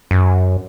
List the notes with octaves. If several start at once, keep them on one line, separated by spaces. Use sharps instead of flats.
F#2